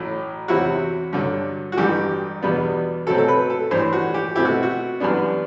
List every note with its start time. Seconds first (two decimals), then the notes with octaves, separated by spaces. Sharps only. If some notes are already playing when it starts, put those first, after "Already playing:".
Already playing: A1 A2 F#3
0.48 E2 C3 F#3 C4 E4 F#4
1.13 G2 D3 F#3
1.72 F#4
1.77 A1 G2 E3 G4
2.42 E2 B2 G3 B3 D4
3.07 B2 F#3 A3 C4 A4
3.18 A4
3.28 B4
3.50 A4
3.71 A2 E3 G3 D4 C5
3.93 F#4
4.14 G4
4.36 B2 A3 C4 E4 G4
4.45 F#4
4.63 F#4
5.00 F#2 E3 G3 B3 D4